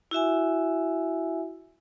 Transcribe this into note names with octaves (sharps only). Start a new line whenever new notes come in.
E4 F#4 E5 G#5